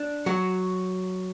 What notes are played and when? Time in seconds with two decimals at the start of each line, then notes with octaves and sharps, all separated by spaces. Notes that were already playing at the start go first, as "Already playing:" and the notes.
Already playing: D4
0.26 F#3 F#4